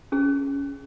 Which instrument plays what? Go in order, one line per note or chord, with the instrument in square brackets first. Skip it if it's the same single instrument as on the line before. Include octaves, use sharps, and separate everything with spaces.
[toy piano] C#4 G#4